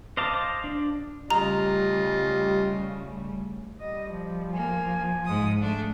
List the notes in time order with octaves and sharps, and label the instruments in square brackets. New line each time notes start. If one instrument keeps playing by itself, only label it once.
[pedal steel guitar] C5 D#5 F5 A5 D6
D4
[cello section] C#3 G3 A3 [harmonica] F4 D#5 [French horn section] G4 [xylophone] A#5
[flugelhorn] G3 [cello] D#5
[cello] F3
[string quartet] A#3 [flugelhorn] G#5
[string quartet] G#2 D#6
A3 D4